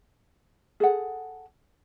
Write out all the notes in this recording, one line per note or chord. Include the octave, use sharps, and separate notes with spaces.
G#4 A4 F#5